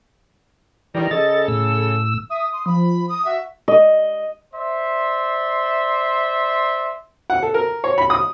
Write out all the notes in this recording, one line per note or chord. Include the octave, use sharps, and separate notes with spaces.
D#3 E3 G3 A#5
C#3 A4 D#5 A6
A2 E6
E5 D#6
C6
F3 B5
D#6
F#4 E5
D#5
C5 D5 E5 C6
F#5
A4
A#4
C#5
B5
D#6